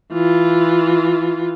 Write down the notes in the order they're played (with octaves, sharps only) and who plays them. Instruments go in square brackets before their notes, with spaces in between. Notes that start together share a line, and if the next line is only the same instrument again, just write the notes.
[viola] E3 F4